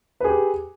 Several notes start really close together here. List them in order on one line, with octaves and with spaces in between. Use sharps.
B4 G#4 G4